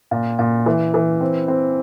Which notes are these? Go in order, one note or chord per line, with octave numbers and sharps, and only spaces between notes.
A#2
A#2
E3
E3
C4
C4